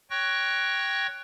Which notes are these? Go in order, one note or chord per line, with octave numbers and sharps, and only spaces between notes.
C#5 G5 C#6 F#6 A#6